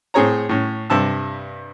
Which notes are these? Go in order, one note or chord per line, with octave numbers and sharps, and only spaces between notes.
A2 C4 G#4 C#5 A#5
A2 C#4
G2 C3 A5 E6